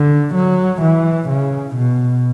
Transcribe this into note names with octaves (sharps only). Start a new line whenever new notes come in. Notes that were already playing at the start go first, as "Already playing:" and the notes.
Already playing: D3
F#3
E3
C#3
B2